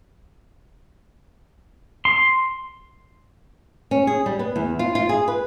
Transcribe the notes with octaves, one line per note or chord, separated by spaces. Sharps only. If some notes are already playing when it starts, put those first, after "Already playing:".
C6
C#4
G#4
G3
B3
E2
F4
F4
G#4
B4